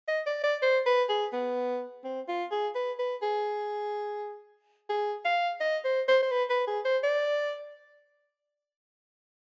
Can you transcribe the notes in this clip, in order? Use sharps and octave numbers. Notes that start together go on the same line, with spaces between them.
D#5
D5
D5
C5
B4
G#4
B3
C4
F4
G#4
B4
B4
G#4
G#4
F5
D#5
C5
C5
C5
B4
B4
G#4
C5
D5